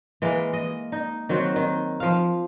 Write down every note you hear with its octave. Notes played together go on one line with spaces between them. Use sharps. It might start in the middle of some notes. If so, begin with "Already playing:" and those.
E3 G#3 A#3
D#5
D#4
D#3 F#3 C4 F#4
D#3
F3 F5